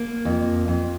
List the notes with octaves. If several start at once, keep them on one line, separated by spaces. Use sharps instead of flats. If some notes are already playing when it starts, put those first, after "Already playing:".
Already playing: A#3
F2
F2